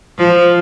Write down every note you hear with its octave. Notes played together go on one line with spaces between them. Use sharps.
F3